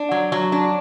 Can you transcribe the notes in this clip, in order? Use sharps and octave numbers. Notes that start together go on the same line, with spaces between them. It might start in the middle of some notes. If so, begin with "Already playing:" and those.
Already playing: D4
F#3
F#3
D4